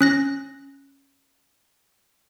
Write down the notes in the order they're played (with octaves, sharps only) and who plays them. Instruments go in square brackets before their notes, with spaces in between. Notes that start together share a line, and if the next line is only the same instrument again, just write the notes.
[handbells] C#4 F#6 A#6